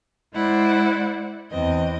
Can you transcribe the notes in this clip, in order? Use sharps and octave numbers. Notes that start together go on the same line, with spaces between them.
G#3 E4 C5 D5 F#5
E2 C4 D#5